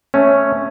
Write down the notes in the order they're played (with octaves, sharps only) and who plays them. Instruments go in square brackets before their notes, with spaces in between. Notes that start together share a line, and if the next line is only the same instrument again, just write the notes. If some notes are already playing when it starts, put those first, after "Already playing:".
[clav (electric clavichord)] A3 C#4